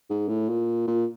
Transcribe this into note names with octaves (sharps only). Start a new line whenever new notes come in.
G#2
A2
A#2
A#2